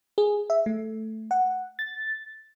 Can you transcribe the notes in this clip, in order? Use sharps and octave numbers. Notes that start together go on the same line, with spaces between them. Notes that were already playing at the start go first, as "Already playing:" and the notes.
G#4
E5
A3
F#5
A6